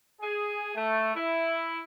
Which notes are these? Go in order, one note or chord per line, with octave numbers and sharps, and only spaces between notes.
G#4
A3
E4